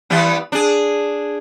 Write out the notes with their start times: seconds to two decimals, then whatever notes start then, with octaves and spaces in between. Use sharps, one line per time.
0.10 E3 G3 B3
0.52 D4 G#4